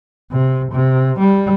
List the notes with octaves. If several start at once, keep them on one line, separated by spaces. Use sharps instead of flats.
C3
C3
G3